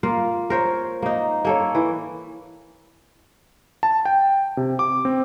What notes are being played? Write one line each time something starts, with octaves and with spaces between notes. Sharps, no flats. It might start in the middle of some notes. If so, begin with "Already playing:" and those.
A#3 F4
A#4 C5 C#5
A#3 D#4
A#3 A4 C#5
E3
A5
G5
C3
D6
C4